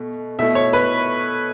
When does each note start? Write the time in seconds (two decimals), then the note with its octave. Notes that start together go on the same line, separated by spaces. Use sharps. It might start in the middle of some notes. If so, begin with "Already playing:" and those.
Already playing: B2 A3
0.39 B2 A3 E4 E5
0.55 C#5
0.73 B4